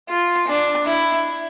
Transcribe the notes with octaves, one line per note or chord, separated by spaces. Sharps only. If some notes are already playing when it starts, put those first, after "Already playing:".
F4
D4
E4